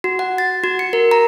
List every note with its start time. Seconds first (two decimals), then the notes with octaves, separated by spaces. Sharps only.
0.04 F#4
0.19 F#5
0.38 A6
0.64 F#4
0.79 C#7
0.93 A#4
1.11 A#5